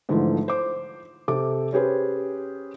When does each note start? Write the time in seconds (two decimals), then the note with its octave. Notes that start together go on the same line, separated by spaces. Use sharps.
0.09 G#2 D3 E3 F3 A3
0.48 C5 D6
1.28 C3 A4 D6
1.73 C#4 G4 G#4 B4 C5